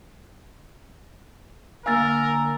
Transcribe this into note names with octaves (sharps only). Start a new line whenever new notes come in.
D3 A#3 A#4 F5 G#5 E6 A6